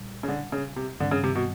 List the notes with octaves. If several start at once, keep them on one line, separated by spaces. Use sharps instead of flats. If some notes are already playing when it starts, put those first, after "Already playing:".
Already playing: A#2 G3
C#3
D3
C#3
C3
G2 D3 D#3 G3 C4
C#3
C3
B2